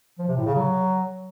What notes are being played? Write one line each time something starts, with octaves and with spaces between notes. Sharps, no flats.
F3
C3
A2
C#3
F#3